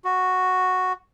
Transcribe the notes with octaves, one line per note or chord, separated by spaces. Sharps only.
F#4